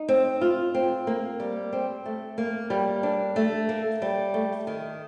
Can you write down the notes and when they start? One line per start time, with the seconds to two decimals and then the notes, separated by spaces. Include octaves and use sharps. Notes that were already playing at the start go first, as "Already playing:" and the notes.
Already playing: D#4
0.08 C4
0.41 F4
0.74 C4
1.07 A#3
1.40 G3
1.73 C4
2.05 A3
2.38 A#3
2.70 G3
3.03 D4
3.36 A3
3.69 A#3
4.02 G3
4.34 A3
4.67 D#3